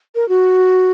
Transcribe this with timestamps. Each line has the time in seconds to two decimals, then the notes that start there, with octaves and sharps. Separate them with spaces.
0.15 A#4
0.29 F#4